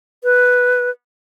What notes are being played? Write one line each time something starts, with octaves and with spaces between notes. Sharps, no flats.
B4